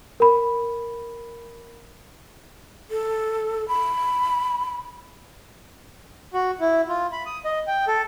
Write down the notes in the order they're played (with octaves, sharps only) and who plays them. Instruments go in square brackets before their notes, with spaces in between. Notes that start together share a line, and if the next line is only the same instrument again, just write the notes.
[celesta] A#4 B5
[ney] A4
B5
[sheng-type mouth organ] F#4
E4
F4
B5
D#6
D#5
G5
A4